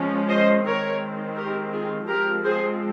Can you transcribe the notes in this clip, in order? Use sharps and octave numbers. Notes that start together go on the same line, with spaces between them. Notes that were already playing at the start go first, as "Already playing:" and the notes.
Already playing: F3 G#3 C#4
C5 D#5
D#3 G#3 C4 A#4 C#5
G4 A#4
F4 G#4
F3 G#3 C4 G4 A#4
G#4 C5